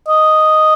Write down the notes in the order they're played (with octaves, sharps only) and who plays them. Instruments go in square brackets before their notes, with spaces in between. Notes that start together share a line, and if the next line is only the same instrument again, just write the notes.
[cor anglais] D#5